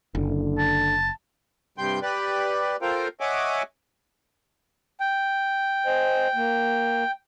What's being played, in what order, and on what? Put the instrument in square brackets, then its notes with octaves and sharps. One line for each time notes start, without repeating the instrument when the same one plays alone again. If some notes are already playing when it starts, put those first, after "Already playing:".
[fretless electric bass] F#1 [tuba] D3
[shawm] A5
[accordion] G2 C3 G3 G5 C6 G6
G4 B4 D5
F4 A4 A#4 C5 F5 G5
C#5 D#5 E5 F#5 G#5 D6
[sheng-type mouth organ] G5
[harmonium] C5 D#5 G#5
A#3